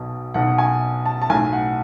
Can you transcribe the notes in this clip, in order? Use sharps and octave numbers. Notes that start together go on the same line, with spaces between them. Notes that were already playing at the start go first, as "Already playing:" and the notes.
Already playing: B1 B2
B1 B2 F#5
G#5
A5
A5
B1 A2 G#5
F#5